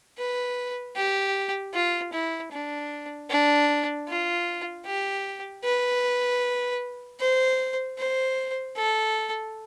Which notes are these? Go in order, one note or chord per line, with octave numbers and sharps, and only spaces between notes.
B4
G4
F4
E4
D4
D4
F4
G4
B4
C5
C5
A4